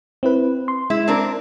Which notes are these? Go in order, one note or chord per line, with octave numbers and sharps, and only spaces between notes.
C4 E4 B4
C6
G#3 E4
C4 D4 A#4